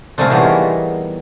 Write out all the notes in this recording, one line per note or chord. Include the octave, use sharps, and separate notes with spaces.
C3 G3 A3 A#3 G#4 A#4
E2 A#3 B3 D#4 C#5 A#5